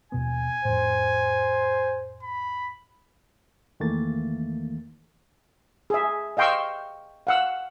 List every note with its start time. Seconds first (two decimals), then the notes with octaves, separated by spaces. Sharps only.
0.12 D#2 B2 B3 G#5
0.65 F2 A2 C5
2.23 B5
3.80 E2 D#3 E3 A3 A#3 A6
5.90 G#4 E5
6.37 D#5 F5 G5 C6 C#6 E6
7.27 F5 F#5 E6